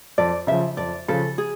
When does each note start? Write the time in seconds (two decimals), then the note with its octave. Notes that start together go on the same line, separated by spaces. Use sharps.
0.18 F2 D5
0.47 C#3 F3 E5
0.77 F2 D5
1.08 C#3 F3 A4
1.38 G#4